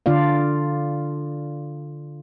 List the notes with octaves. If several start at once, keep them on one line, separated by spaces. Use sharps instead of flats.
D3 D4 F4 D5 F5